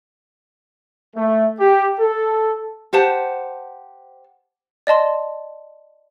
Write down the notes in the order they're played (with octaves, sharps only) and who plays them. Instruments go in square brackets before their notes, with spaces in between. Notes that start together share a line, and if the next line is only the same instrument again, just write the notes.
[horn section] A3
G4
A4
[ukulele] G4 C5 F#5 A5
[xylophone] D5 D#5 A5 C6